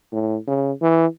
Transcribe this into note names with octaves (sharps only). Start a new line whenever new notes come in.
A2
C#3
E3